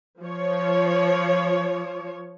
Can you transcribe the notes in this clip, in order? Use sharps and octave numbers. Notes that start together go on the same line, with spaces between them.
F3 C#5